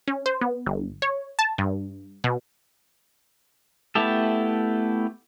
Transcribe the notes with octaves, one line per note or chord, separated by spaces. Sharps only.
C#4
C5
B3
G1
C#5
A5
G2
B2
A3 B3 E4 G4 A4